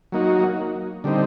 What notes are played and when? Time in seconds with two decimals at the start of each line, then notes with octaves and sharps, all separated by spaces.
0.12 F#3 A#3 D#4 F#4
1.04 D3 G3 C4 D#4